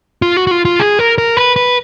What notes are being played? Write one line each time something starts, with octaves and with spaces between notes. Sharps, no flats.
F4
F#4
F#4
F4
F4
G#4
A#4
A#4
B4
B4